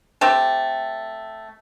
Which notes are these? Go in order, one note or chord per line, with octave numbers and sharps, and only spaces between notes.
A3 C4 G4 A4